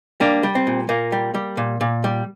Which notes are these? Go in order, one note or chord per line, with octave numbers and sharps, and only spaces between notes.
G3 A#3 D4
G3
C4
A#2
A#2 A#3
G3
G3
A#2
A#2
G3